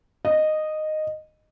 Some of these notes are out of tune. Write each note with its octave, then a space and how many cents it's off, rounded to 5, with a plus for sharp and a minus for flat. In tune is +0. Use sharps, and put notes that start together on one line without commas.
D#5 -10